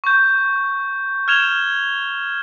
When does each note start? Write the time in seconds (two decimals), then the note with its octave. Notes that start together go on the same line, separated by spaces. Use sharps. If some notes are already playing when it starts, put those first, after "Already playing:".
0.04 C#6 G6
1.28 F6 G#6 E7 F7 G7